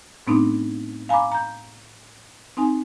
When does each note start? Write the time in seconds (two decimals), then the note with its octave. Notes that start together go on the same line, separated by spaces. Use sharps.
0.27 A2 A3 B3 C4 D4 D#4
1.09 F5 G#5 A#5 B5 D6
1.32 A#5 G6
2.57 C4 D#4 G#5